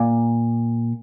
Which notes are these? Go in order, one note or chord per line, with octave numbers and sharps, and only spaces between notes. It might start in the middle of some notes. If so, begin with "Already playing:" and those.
Already playing: A#2